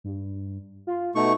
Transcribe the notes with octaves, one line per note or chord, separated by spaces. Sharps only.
G2
F4
B2 A3 D#4 C#6